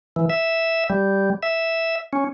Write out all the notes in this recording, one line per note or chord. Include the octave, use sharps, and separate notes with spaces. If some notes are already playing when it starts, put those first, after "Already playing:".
E3
E5
G3
E5
C#4